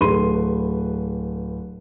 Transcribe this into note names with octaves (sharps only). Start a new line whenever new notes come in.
D1 A3 B4 C6 D#7